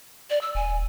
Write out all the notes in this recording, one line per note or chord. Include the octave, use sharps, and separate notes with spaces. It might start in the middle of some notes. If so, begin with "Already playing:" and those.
D5
E6
D#1 G#5